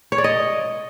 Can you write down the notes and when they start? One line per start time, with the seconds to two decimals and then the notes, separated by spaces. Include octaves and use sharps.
0.12 C#5
0.18 D5
0.24 D#5